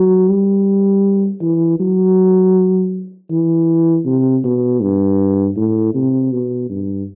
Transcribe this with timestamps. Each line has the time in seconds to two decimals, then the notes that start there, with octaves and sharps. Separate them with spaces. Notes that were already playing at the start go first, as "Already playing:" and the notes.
Already playing: F#3
0.29 G3
1.41 E3
1.80 F#3
3.30 E3
4.05 C3
4.44 B2
4.81 G2
5.56 A2
5.94 C3
6.32 B2
6.69 G2